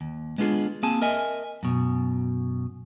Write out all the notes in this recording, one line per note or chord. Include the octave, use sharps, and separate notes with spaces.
D#2
G#3 B3 D4 F4 G#4
A#3 C4 G#4 G#5 A5
A#4 D#5 E5 G#5
F#2 B2